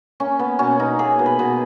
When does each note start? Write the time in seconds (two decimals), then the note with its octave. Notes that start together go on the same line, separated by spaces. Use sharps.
0.20 A#3 C#4
0.39 A#3 B3
0.59 B2 C#4
0.79 B2 D#4
0.99 A#3 G#4
1.19 B2
1.26 B4
1.39 B2